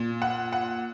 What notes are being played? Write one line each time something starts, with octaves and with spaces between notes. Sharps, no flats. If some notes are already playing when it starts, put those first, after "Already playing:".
Already playing: A#2
F#5
F#5